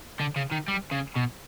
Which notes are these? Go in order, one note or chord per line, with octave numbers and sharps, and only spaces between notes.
D3
C#3
D#3
G3
C#3
B2